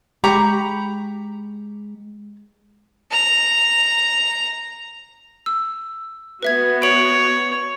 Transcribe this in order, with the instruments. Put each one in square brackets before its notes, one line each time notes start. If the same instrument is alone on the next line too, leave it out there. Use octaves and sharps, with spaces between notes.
[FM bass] G#3 [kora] G4 [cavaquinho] A#5 B5 C#6
[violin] A#5 F7
[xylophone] E6
[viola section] B3 F#4 [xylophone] B4 E5 G#6
[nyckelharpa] C#5 [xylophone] D7 F#7